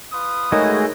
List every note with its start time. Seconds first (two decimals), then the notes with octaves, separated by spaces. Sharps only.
0.13 F4 B4 D#6
0.52 G#3 A3 D#4 F#4 G#4 A#4 C#5 D#5